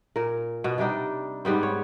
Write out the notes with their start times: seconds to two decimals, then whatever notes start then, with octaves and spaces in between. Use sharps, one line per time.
0.16 A#2 A#4
0.64 B2 B3
0.78 C3 G3 D4 D#4
1.45 G#2 G3 B3 C4
1.63 C#5